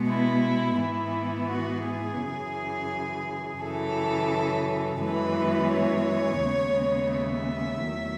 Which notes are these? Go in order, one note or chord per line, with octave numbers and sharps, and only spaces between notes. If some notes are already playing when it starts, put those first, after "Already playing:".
Already playing: B2 G#3 B3
E4
G#2 E3 B3 E4
F#4
G#4
F#2 C#3 E3
F#2 C#3 E3 A4
F#2 E3 G#3 B3 B4
C#5
D#2 C#3 G#3 B3
E5
E2 D#3 F#3 A3